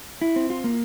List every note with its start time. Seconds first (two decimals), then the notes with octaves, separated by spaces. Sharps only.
0.21 E4
0.36 C4
0.50 F4
0.64 A#3